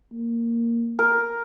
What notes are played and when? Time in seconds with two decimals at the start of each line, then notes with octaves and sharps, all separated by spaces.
0.12 A#3
0.99 A#4